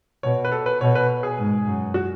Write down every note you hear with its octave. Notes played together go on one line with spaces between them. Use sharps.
B2 C#5
B4
A4
B4
B2 C#5
B4
G#4
G#2
F#2
F#4